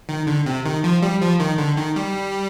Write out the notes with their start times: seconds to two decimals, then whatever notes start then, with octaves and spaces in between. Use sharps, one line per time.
0.09 D#3
0.27 D3
0.46 C3
0.65 D#3
0.84 F3
1.02 G3
1.21 F3
1.40 D#3
1.58 D3
1.77 D#3
1.96 G3